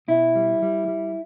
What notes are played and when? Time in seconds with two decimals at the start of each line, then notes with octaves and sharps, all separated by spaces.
0.08 B2 E4
0.35 G3
0.62 G3
0.88 G3